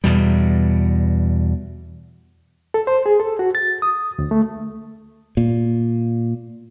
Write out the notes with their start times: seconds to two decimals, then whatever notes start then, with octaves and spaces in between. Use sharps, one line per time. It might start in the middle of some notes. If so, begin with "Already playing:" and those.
0.04 E2 B2 G3
2.74 A4
2.87 C5
3.06 G#4
3.20 A4
3.39 F#4
3.55 A6
3.82 D#6
4.19 D2
4.31 A3
5.37 A#2